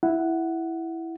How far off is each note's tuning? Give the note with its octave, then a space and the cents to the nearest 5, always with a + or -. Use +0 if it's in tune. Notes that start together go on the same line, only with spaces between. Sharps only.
E4 +0 F#5 +0